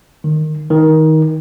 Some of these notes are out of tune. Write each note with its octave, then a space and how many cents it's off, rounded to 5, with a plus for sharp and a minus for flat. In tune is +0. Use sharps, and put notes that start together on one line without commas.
D#3 -10
D#3 +20